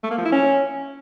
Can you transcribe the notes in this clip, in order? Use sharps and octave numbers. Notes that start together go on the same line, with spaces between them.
A3
A#3
F3
E4
C#4